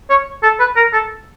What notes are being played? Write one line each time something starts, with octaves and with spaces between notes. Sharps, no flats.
C#5
A4
B4
A#4
A4